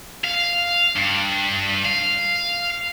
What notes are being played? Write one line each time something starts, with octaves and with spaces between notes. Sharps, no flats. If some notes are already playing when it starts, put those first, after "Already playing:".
F5
G2
F5